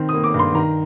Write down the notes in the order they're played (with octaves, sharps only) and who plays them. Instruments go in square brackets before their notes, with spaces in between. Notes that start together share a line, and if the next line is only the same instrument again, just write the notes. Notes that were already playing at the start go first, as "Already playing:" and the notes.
Already playing: [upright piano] D#3 C4
D#6
A#3
D6
G2
C6
D#3 A#5